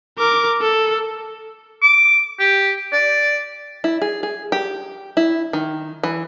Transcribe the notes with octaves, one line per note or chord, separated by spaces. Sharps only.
A#4 D6
A4
D6
G4
D5
E4
G#4
G#4
G4
E4
D#3
E3